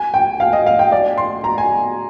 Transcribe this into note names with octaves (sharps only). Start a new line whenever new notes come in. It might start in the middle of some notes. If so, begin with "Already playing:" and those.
Already playing: G#5
G5
F5
D#5
F5
G5
D5
C6
A#5
G#5